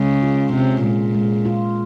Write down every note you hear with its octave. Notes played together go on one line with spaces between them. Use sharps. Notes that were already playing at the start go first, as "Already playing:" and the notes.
Already playing: C#3 G#3
F4
C3 C#4
A#2 G#3
G#3
F4